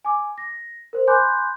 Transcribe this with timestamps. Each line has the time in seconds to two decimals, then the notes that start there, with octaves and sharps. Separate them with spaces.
0.05 G#5 D6
0.38 A#6
0.93 A#4 C5
1.07 G#5 B5 C6 D6 F#6 G6